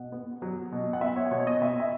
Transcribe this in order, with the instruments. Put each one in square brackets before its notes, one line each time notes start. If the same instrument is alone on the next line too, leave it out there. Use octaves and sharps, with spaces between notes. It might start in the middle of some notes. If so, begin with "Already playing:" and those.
Already playing: [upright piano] B2 F#5
B3
F#3
B2
F#5
B3 E5
C#5
B2 C#5
D#5
B2 E5
E5